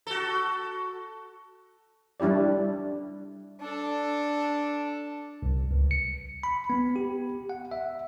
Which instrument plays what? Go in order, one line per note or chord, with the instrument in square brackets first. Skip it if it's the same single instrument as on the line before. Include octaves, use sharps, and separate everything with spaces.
[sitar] F#4 A4
[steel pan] G3 D4 E4 G4 D5
[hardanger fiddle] D4 A4
[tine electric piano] C2
C#2
C#7
B5
B3
G4
F#5
E5